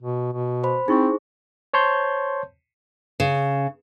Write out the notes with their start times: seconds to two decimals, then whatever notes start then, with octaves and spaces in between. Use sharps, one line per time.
0.02 B2
0.33 B2
0.64 C5 B5
0.88 C4 D#4 E4 G#4 C5 C#6
1.74 C5 C#5 A5 C6 G6
3.20 C#3